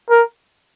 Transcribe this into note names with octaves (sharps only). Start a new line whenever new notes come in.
A#4